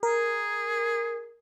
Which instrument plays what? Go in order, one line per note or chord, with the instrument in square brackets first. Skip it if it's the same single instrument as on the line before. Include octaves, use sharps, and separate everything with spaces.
[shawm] G#4 [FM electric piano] A#4